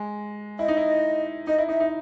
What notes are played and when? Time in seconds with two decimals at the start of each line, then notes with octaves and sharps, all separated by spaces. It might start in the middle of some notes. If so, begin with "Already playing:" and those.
Already playing: G#3
0.59 E4 D#5
0.68 D#4
0.77 E4
1.47 D#4 D#5
1.58 E4
1.69 D#4 E5
1.80 D#4